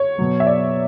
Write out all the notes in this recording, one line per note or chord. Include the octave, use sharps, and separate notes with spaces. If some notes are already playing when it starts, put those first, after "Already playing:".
Already playing: C#5
B2 F#3
E5
D5